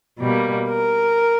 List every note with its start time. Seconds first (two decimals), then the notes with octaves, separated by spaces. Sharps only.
0.20 B2 G3 A#3
0.69 A#4